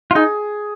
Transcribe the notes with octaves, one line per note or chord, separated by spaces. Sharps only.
F4
D#4 G#4